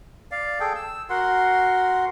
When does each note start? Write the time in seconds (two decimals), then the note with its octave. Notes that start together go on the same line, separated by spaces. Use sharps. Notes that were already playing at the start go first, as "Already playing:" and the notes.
0.31 D5 F5
0.60 G#4 A4 G5
0.76 E6
1.10 F#4 A#4 F#5 C6